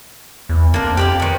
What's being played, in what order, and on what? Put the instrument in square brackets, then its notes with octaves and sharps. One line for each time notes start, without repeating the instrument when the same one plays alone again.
[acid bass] E2
[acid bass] F2 [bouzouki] A#3 D4
[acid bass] F2 [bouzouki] G4 B4 D5
[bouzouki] D#3 B3